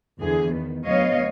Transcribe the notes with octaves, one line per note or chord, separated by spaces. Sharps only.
E2 D3 G#4
D#3 B3
D2 F#3 B3 C#5 D#5 F5